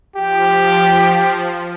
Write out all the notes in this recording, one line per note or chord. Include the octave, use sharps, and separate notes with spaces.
F3 G4